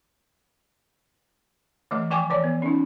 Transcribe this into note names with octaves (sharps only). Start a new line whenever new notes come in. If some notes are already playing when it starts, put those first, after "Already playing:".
E3 A3 D#5
F3 G5 G#5 C#6 D6
E3 C#5 D5
B3
C#4 D#4